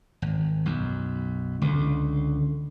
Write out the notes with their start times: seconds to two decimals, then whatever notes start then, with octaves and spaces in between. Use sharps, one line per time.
0.22 G#1
0.66 B1 F#2
1.62 C#2 D3